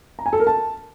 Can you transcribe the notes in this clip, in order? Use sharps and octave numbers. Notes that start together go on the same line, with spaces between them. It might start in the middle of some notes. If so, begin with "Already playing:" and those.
A#5
G#5
A4
A#4
A5